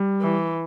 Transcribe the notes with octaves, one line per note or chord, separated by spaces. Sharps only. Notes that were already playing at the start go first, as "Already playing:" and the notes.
Already playing: G3
E3